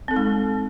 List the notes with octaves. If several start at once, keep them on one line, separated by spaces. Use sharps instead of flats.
G#3 C4 D#4 A4